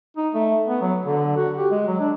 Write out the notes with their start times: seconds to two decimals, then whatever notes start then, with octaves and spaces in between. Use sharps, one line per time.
0.17 D#4
0.34 A3
0.68 B3
0.82 F#3
1.06 D3
1.37 F#4
1.58 G4
1.71 G#3
1.88 F#3
2.00 D4